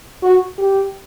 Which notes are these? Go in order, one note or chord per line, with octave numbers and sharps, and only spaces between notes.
F#4
G4